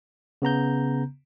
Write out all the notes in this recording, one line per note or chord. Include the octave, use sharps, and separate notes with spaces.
C#3 B3 A#5 G6